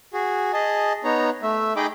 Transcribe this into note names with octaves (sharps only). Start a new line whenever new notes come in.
F#4 G#4
G#4 D#5 A5
B3 D#4 C#5 A#5
A3 E5
D#4 G#4 D#5 G5 B5 D6